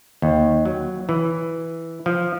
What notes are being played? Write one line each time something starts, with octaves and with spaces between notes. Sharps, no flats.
D#2
F#3
E3
F3